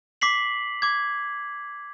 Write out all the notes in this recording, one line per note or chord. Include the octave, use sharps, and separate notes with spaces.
D6 B6 C7 F#7
D6 G#6